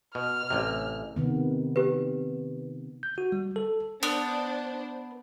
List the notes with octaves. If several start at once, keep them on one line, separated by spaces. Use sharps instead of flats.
B2 F6
A1 C3
C3 D#3 B3
G4 B4
G6
F#4
G3
A4
B3 D4 C5